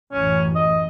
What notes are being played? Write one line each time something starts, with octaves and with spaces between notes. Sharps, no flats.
A1 F#2 C#4
D#5